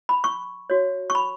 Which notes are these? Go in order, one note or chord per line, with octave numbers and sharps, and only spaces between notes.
B5
C#6
F#4 C#5
C#6
B5